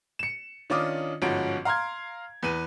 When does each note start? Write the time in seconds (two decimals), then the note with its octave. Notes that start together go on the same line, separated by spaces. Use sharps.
0.19 C#7 E7
0.70 D#3 C#4 D4 F4 D6 D#6
1.22 G1 G#2 F3 C#4 F#4 D7
1.65 F5 A#5 C6 F6 G#6
2.43 E2 B4 D#7